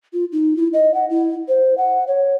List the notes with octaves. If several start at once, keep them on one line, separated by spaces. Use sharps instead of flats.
F4
D#4
E4
D#5
F#5
E4
C5
F#5
C#5